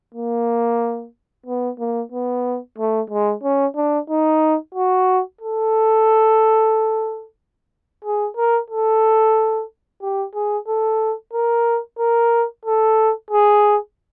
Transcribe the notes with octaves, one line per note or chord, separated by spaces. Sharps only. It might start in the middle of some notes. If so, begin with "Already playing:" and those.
A#3
B3
A#3
B3
A3
G#3
C#4
D4
D#4
F#4
A4
G#4
A#4
A4
G4
G#4
A4
A#4
A#4
A4
G#4